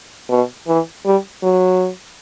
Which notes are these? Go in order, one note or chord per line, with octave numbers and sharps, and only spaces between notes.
B2
E3
G3
F#3